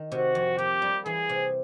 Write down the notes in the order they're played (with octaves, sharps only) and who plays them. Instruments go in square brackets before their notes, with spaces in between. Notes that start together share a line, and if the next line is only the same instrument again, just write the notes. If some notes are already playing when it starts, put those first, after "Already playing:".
Already playing: [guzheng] D#3
[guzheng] C3 [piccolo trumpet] F#4
[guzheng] F2
[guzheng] A#3 [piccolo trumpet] G4
[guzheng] G3
[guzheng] E3 [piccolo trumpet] G#4
[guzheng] C3